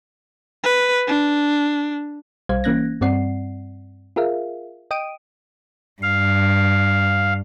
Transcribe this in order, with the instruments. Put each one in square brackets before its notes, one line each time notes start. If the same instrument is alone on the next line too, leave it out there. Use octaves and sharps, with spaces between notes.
[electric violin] B4
D4
[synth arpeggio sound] B1 G3 C5 F5 G#6
E3 A#3 C#4 F#6 G#6 A#6
G2 G3 C4 D5 F#5 C7
F4 G#4 A#4 E5 F5
D#5 G5 D#6 D7 D#7
[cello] G2 [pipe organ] F5